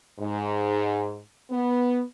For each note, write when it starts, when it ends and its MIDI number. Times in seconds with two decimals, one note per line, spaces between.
0.19 1.18 44
1.51 2.02 59